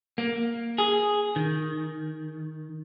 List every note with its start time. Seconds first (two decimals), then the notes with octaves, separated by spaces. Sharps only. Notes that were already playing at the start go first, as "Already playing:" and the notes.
0.18 A#3
0.78 G#4
1.36 D#3